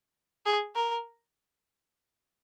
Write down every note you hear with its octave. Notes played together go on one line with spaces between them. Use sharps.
G#4
A#4